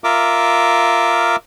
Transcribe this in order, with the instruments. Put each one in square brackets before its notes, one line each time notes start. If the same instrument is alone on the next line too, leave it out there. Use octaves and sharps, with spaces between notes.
[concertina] F4 A#4 E5 D6